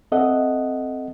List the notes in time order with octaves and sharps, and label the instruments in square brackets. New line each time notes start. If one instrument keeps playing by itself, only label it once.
[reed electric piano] C4 A4 D#5 E5 F#5